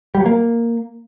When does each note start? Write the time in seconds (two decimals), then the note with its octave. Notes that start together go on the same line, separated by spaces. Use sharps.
0.15 G3
0.20 F#3
0.26 A#3